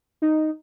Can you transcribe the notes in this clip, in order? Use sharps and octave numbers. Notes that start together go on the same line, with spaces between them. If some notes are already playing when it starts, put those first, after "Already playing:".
D#4